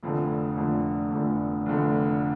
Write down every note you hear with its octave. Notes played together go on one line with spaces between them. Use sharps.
F1 F2 D3 A3
F1 F2 D3 A3
F1 F2 D3 A3
F1 F2 D3 A3